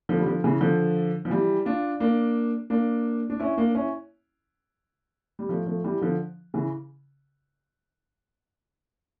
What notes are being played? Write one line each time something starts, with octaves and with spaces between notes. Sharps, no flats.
D3 F3
G3
D3 F3
C#3 E3
D3 F3
F3
E3 G3
D4 F4
A#3 D4
A#3 D4
D4
C#4 E4
A#3 D4
C#4 E4
G3
F3 A3
F3 A3
E3 G3
D3 F3
C#3 E3